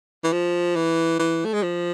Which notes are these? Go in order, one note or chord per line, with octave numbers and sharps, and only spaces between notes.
E3
F3
E3
E3
A3
G#3
F3